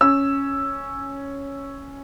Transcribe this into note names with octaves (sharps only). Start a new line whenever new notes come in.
C#4 E6